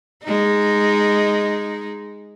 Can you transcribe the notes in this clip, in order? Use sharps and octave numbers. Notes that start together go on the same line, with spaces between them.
G#3 D#4